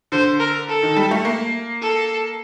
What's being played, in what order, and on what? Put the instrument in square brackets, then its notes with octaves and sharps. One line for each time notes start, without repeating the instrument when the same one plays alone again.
[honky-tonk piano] D3 [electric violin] C5
[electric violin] A#4
A4
[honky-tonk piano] D#3
G3
A3
A#3
[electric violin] A4